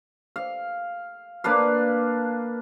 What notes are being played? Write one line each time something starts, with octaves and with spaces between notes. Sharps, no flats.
F5
A#3 D4 B4 F5